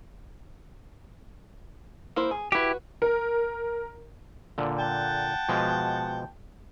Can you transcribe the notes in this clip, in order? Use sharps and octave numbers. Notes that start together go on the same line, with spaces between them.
A#3 E4 C5
G#4
E4 F#4 G4 B4
A#4
A#2 D3
F#5 G5 A5
B2 F3 G#3